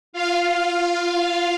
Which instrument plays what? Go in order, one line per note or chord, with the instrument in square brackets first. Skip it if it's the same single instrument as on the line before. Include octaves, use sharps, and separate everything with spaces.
[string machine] F4 F5